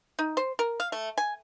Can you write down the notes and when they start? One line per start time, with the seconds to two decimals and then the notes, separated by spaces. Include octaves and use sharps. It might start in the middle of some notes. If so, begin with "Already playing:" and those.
0.19 D#4
0.37 C5
0.59 A#4
0.80 F5
0.92 A3
1.18 G#5